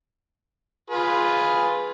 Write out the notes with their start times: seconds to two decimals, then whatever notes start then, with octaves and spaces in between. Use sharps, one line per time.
0.90 F4 G#4 B4